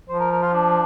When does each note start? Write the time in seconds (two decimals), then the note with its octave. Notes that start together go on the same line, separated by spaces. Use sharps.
0.09 F3 C5
0.20 A#4
0.31 A#4
0.42 F4
0.53 D4